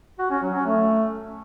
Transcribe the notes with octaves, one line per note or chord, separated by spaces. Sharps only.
F#4
C#4
F#3
C#4
A3